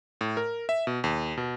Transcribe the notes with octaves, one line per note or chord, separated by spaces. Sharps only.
A2
A#4
E5
B2
D#2
B2